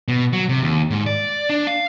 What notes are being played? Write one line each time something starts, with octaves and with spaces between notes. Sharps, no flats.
B2
F#3
C3
D#2
G#2
D5
D4
F5